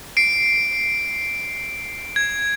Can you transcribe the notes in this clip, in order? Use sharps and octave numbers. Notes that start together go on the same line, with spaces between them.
C7 D7
G#6